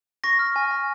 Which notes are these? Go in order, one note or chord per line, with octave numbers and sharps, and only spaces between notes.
C#6 A#6
F6
G#5
G#5